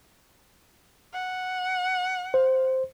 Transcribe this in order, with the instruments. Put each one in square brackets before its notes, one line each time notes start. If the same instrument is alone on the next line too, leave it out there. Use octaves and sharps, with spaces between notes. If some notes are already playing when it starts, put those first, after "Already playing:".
[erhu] F#5
[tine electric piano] C5